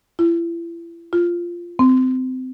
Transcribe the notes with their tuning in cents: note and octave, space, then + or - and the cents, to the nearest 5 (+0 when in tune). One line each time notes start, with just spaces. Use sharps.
E4 +35
F4 -10
C4 -25